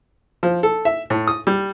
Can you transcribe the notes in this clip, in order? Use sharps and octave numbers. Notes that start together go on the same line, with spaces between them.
F3
A4
E5
A2
D#6
G3